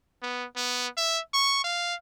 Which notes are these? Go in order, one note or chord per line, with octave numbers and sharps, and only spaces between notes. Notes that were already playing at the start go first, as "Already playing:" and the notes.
B3
B3
E5
C#6
F5